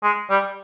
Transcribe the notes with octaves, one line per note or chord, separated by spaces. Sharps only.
G#3
G3